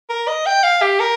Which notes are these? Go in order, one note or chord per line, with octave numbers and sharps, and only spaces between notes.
A#4
D#5
G5
F5
G4
A#4